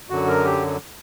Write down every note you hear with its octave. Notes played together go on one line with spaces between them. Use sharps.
F#2 D3 F#3 F#4
A#4
G4